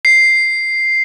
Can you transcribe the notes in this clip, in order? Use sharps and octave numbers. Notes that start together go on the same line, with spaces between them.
C7